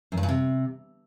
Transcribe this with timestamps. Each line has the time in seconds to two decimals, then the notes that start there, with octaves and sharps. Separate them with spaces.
0.12 F#2
0.17 G2
0.23 A#2
0.29 C3